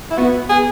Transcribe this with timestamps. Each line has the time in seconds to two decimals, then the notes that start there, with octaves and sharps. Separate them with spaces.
0.10 E4
0.18 B3 F#4
0.49 G#4